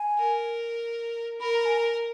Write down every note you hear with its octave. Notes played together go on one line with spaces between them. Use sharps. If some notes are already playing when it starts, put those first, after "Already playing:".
Already playing: G#5
A#4
A#4 B5
A#5
G#5
A#5